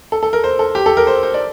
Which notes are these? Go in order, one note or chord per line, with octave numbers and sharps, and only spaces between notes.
A4
A4
A#4
C5
A4
G4
A4
A#4
C5
C5
D5